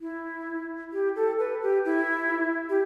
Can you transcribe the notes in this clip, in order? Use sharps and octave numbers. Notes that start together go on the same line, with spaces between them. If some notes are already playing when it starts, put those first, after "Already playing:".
E4
G4
A4
B4
G4
E4
G4